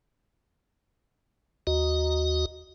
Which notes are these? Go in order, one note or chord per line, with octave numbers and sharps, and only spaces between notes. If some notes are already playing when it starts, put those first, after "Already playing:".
D#2 F#4 D#5